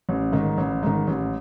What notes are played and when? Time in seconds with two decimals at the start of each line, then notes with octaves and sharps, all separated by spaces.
0.09 A1
0.33 G#2 D#3
0.57 A1
0.83 G#2 D#3
1.07 A1